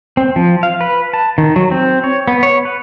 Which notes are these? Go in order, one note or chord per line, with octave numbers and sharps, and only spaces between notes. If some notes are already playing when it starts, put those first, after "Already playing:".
C4
F3
F5
B4
A5
D#3
F#3
C4
C#5
B3
C#5
B4